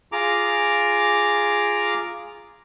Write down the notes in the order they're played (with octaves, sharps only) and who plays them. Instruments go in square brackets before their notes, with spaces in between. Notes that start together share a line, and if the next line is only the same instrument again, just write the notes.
[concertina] F4 G#4 A#5 D6